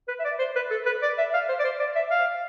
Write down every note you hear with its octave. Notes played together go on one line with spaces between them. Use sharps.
B4
E5
D5
C5
B4
A4
B4
D5
E5
F5
C5
D5
C5
D5
E5
F5